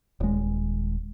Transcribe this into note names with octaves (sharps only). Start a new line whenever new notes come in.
D#1 G#3